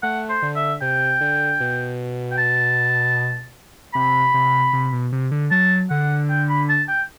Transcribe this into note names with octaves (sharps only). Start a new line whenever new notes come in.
A3 F#5
C5
D3
E5
C3 G5
D3
B2
G5
A5
C3 B5
C3
C3
B2
C3
D3
F#3 A5
D3 F#5
G5
B5
A5
G5